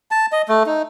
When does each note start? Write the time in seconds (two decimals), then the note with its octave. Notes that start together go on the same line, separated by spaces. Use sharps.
0.11 A5
0.32 D#5
0.48 A3
0.66 D#4